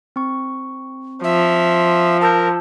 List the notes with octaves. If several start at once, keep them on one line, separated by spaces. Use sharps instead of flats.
C4 C#6
F3 E5
A#4 A5 E6 G6